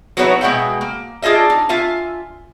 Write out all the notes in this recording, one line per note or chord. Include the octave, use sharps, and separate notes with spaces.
F#3 B3 D#4 E4 F#4 C#5
B2 G#3 D#5 E5 F#5 G5
A#3
D4 F4 G#4 D#5 E5
D#4
F4 E5 G#5